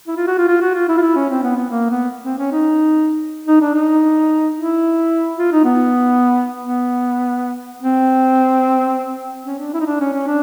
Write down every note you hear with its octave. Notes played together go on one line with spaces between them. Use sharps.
E4
F4
F#4
F4
F4
F#4
F4
E4
F4
E4
C#4
C4
B3
B3
A#3
B3
C4
C#4
D#4
D#4
D4
D#4
E4
F4
D#4
B3
B3
C4
C#4
D4
E4
D#4
D4
C#4
C#4
D4